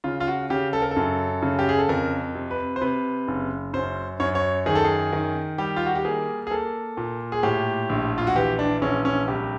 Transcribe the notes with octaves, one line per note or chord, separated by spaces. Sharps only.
C#3 F4
F4
F#4
C#3 G4
A4
A#4
A4
F#2
C#3
G4
G#4
A4
F2 A#4
C3
B4
C5
C3 B4
F#1
F#2 C5
F#2 C#5
C#5
D#3 G#4
A4
G#4
D#3
G3 G4
F4
F#4
G4
A#3 G#4
G#4
A#3 A4
A#2
G#4
A2 G4
A#1
F4
F#4
E3 G4
D4
A#1 C#4
C#4
C2 G4